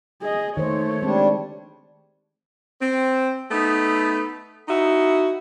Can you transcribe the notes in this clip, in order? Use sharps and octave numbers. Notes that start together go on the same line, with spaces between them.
G#4 D#5
D#3 A3 C5 C#5
G3 G#3 C4 D4
C4
A3 B3 D#4
D#4 E4 F#4